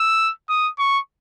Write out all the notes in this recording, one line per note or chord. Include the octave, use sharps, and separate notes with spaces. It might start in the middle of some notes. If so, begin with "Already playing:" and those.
Already playing: E6
D#6
C#6